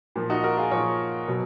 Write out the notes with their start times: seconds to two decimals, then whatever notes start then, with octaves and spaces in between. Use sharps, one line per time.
0.16 A#2 F3
0.30 D#4 F#4
0.44 F#4 A#4
0.57 F4 G#4
0.71 A#2 F3 A#4 C#5
1.28 B2 F#3